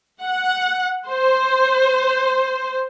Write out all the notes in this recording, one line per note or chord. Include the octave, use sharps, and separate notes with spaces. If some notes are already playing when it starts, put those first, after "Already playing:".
F#5
C5